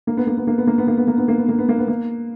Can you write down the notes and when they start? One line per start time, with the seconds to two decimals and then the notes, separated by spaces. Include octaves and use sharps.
0.07 A#3
0.17 B3
0.27 A#3
0.37 B3
0.47 A#3
0.58 B3
0.67 A#3
0.78 B3
0.88 A#3
0.98 B3
1.08 A#3
1.18 B3
1.28 A#3
1.38 B3
1.49 A#3
1.59 B3
1.69 A#3
1.79 B3
1.88 A#3